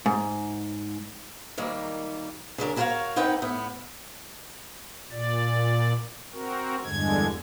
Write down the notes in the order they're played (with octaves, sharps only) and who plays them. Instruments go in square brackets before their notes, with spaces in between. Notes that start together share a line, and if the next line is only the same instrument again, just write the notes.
[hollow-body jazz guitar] G#2
[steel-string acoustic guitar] D#3 F#3 G3 A#3
C#3 F#3 D4 A#4
E4 F#4 A#4 B4 C#5 F5
A#3 C4 D#4 B4 F#5 G5
A2 B3
[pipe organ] A#2 D5
C4 F#4 A#4
E2 G2 D3 G#3 G#6